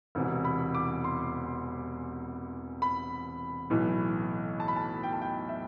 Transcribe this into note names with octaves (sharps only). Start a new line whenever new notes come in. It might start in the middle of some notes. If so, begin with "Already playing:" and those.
E1 E2 C3 E3
B5
D6
C6
B5
B1 A2 E3
A5
B5
A5
G5
A5
G5
E5